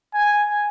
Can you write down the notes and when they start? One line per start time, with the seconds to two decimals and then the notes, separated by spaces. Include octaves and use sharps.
0.14 G#5